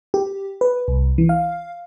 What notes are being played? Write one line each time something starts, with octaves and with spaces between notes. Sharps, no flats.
G4
B4
C2
E3
F5